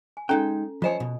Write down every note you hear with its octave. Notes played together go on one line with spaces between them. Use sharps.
G#5
G#3 C#4 D#4 A4 G5 A#5
F3 F4 C5 C#5 D#5 G#5
B2